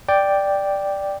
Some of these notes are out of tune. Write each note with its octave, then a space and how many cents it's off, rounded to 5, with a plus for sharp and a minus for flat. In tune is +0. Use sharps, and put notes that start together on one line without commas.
D5 +0 G5 +0